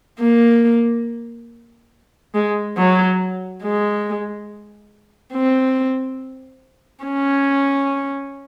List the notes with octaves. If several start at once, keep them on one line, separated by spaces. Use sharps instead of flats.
A#3
G#3
F#3
G#3
C4
C#4